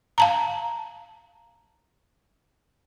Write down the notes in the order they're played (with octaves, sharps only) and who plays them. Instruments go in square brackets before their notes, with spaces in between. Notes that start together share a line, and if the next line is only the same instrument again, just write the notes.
[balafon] F5 A5 A#5